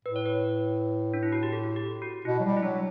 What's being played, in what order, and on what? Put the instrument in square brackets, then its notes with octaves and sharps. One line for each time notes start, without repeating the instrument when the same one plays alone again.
[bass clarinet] A2 [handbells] B4
[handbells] C#5
B4
D4
E4
F#4
G4
A4
G4
F#4
[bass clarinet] B2 [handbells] E4
[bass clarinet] F#3
G3
[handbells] E4
[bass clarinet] F#3 [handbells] D4